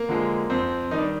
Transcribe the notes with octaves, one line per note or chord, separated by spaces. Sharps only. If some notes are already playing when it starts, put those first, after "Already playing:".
Already playing: A#3
D3 F3 G#3
F2 C4
D#3 G3 D#4
D4